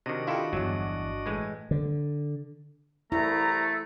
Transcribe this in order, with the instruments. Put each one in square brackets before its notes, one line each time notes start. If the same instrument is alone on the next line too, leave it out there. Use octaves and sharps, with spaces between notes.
[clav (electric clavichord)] C3 D#3 [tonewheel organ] D4 F#4 D#5
[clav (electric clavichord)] D#3 E4 A4 [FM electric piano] F4 G4
[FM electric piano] G1 [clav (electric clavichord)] E2 F#3
[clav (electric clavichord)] A2 E3 G#3
[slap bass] D3
[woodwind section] C2 A#5 [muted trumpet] A3 [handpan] E4